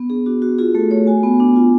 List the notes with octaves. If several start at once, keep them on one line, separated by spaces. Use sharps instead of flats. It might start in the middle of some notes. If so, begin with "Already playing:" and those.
Already playing: B3
D4 G#4
D4 F#4
F#4
F4 G#4
A3 A4
A3 C#5
F#4 G#5
B3
D4
F4